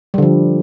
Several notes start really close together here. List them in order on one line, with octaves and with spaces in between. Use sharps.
G3 D3 F3